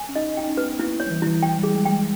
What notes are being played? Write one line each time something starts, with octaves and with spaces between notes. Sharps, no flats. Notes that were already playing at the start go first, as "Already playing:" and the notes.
Already playing: G#5
C#4
D#4 D#5
D#4 G5
C#4
B4
B3
A#3 E4
C#5
G3
E3
E3 E4
G5
G3 G#4
G#3
G5
G#3